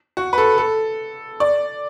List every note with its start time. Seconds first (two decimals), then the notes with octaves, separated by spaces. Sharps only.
0.17 F#4
0.33 B4
0.38 A4
0.58 A4
1.40 D5